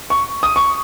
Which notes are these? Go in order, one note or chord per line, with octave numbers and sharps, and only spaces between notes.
C#6
D#6
C#6